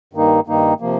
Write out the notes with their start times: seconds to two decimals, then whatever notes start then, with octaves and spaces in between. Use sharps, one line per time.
0.13 G2 D#3 A#3 D#4
0.47 G2 D#3 A#3 D#4
0.80 C3 F3 A#3